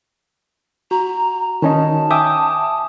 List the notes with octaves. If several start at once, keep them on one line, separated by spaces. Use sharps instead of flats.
F#4 A#5
D#3 C#4 D#4 A5
E5 G5 G#5 D6 D#6